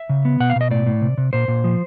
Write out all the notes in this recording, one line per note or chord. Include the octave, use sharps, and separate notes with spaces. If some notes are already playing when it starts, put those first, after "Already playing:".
Already playing: E5
C#3
B3
B2 F#5
F5
B2 D#5
A2 D5
A2
C3
C3
A#2 C5
A#2
F3